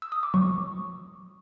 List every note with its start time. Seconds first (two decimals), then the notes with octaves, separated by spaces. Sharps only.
0.02 E6
0.12 D#6
0.23 D6
0.34 F#3 C#6